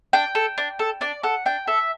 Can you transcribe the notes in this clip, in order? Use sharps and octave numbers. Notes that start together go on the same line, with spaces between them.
D4 G5
A4
D4
A4
D4 D5
A4 F#5
D4 G5
A4 E5